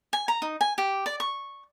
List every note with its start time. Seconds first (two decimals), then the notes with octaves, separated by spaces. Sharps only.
0.13 G#5
0.28 A#5
0.42 D#4
0.61 G#5
0.78 G4
1.06 D5
1.20 C#6